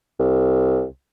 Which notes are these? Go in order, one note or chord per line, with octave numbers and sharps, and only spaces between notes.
C2